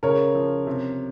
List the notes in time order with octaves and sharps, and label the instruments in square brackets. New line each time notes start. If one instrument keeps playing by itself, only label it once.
[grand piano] C#3 [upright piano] A#4 C#5
[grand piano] F3
C3